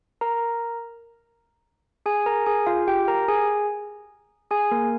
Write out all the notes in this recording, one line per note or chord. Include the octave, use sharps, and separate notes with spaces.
A#4 A#5
G#4 G#5
A#4 A#5
G#4 G#5
F4 F5
G4 G5
A#4 A#5
G#4 G#5
G#4 G#5
A#3 A#4